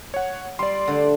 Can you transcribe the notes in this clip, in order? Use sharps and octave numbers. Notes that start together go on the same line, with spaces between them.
C#5 F#5
G3 D5 C6
D3 A3